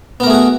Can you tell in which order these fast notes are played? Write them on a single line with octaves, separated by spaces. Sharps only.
B3 A#4 A3 G#4 F#4